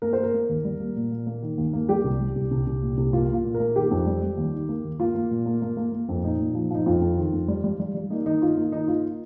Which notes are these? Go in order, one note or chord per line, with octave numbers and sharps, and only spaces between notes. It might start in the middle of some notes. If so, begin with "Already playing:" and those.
A#3 A#4
A#3 C5
A#4
A#3
D#2
G3
A#3
A#2
A#2
A#3
D#3
D#2
A#3
G3 G4
C2
G3
C2
C2
C2
A#2
C2
A#3 F4
A#3 F4
A#2
A#4
A#3
D#3 G4
F2
G3
G3
D#2
D#3
A#3
D#2
A#3 F4
A#3
A#2
A#3
A#3
A#3
A#3
F2
A#2 D#4
A#2
F3
F3 D#4
F2 F4
F2
D#3
F2
G3
G3
G3
G3
A#3 D#4
D#3 D#4
D#3 F4
A#3 D#4
D#3 D#4
A#3 F4